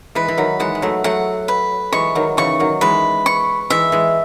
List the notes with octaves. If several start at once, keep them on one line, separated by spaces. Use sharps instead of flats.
E3 G#3 B4
E3
D#3 F#3
E3 G#3 F#5
G#3
F#3 A3
F#3 A3 F#5
B4
E3 G#3 C#6
D#3 F#3
C#3 E3 C#6
D#3 F#3
E3 G#3 B4
C#6
E3 G#3 E5
E3 G#3